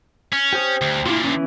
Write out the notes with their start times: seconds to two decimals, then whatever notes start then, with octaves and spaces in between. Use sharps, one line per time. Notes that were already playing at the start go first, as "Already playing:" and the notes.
0.33 C#4
0.53 G4 C5 D#6
0.81 D2
1.06 A#2 D3 E4 F4
1.24 E3 B3 C#4